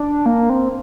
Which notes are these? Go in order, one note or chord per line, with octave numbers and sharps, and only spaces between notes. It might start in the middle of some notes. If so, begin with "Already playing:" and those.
Already playing: D4
A#3
C4